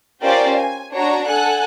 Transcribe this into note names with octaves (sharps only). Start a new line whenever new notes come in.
C#4 F4 G4 A#4 C5 D5
G#5
D4 F#4 C#5 A#5
A4 F#5 G#5 F#6